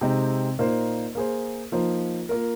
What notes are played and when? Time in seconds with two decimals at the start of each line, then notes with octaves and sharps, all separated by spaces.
0.01 C3 G#3 C4 D#4
0.58 A#2 A#3 D#4 C5
1.15 A#3 G#4 C5
1.72 F3 A#3 D#4 C5
2.29 A#3 F4 A#4